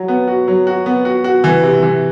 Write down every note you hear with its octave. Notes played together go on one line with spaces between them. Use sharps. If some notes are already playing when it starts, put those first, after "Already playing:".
Already playing: F#3
B3
F#4
F#3
F#4
B3
F#4
F#4
E3
C3
E3